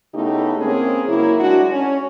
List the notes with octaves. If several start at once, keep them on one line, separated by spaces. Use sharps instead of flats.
C#3 A3 B3 D#4 E4 G4
G#3 A#3 C4 C#4 G#4
C#3 F#3 A#3 E4
G#3 D4 F#4
C#4